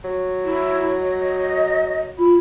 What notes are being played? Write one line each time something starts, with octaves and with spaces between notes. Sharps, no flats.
F#3
E4
D#5
F4 B5